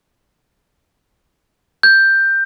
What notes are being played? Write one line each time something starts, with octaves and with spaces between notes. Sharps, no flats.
G6